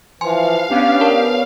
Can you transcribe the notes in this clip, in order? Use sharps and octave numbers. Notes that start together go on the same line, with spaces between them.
E3 F3 F5 G#5 C6
B3 C#4 D4 G4 G5
A#4 A5